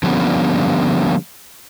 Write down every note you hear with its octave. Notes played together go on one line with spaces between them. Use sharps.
D3 F3 G3 A#3 B3 C#4